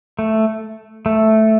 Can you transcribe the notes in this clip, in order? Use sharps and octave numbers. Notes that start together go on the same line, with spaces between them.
A3
A3